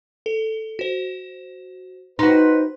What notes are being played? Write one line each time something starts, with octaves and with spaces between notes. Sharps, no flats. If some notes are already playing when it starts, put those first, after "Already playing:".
A4
F#4 C5
D#4 F#4 B4 C5 C6